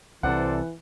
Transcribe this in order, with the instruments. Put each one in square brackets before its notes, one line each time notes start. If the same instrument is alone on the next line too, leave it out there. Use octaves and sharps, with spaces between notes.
[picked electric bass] C2 C3 [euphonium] E3 [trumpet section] A4 C5 D5 [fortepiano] F#5